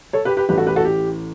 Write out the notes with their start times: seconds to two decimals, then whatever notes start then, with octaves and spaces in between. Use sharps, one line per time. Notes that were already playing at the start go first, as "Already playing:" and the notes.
0.13 A4 C#5
0.25 G4 B4
0.37 G4 B4
0.49 A1 A2 E3 G4 B4
0.58 F#4 A4
0.67 G4 B4
0.76 F#4 A4
0.85 G4